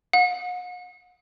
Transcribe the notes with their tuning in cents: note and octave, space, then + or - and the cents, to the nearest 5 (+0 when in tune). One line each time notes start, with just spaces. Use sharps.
F#5 -45